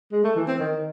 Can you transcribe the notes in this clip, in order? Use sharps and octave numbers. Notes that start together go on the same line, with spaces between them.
G#3
A3
E3
C4
D#3